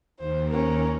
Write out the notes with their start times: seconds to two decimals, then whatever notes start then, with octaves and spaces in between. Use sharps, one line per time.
0.19 D#2 C5
0.50 C#4 A#4